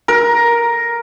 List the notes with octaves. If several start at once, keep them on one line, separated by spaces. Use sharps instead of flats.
A#4